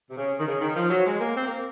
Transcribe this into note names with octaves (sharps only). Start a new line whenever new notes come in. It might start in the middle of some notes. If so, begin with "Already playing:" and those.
C3
C#3
D#3
C#3
D#3
F3
F#3
G#3
A#3
C4
A#3